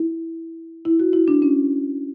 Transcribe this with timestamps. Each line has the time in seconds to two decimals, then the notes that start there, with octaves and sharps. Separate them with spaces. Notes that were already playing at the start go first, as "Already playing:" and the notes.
Already playing: E4
0.85 E4
1.00 F#4
1.13 E4
1.28 D4
1.42 C#4